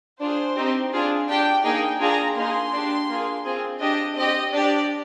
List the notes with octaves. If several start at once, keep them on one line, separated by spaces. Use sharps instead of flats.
D4 F4 G#4 C5
C4 D#4 G4
D4 F4 G#4
D4 G4 G5
A#3 D#4 G#4 G5
D4 F4 G#4 A#5
A#3 D#4 G#4 C6
D4 G4
A#3 F4 G#4
C4 F4 G#4
D4 G4 D#5
C4 G4 D#5
D4 G4 D5